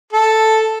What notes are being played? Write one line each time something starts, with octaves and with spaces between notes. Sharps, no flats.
A4